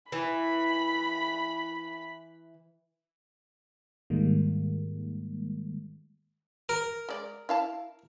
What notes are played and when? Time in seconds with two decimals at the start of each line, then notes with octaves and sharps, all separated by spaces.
0.12 E3 B5
4.10 G#2 D#3 G3 G#3 A#3
6.69 A#4
7.09 G#3 D5
7.49 E4 F5 A5